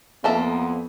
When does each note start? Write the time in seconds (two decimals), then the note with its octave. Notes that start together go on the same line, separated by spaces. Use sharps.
0.24 F2 A#3 B3 A4 E5